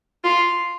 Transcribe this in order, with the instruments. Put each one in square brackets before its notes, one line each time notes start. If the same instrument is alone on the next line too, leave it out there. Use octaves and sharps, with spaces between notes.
[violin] F4